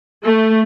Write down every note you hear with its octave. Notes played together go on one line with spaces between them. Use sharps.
A3